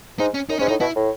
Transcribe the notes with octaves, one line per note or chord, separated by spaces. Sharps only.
G#2 D#4
C#4
F#2 D#4
G#2 C#4
A2 D#4
B2 E4
A2